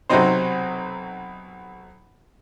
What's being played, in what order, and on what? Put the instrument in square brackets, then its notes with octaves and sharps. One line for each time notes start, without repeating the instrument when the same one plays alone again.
[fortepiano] B1 C3 F#3 C4 D#4 C5